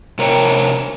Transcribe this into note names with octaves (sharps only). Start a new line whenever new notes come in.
C3 A#4 C#5 G5